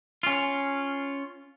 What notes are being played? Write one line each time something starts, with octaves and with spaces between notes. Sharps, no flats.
C#4 F4